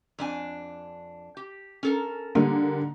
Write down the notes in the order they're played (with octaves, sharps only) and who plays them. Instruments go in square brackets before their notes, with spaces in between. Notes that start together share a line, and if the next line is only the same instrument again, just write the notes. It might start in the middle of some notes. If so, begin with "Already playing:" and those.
[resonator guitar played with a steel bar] F2 D4 G#5
G4
C#4 A4 A#4
[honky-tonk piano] D3 G3 A#3 [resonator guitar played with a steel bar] D#4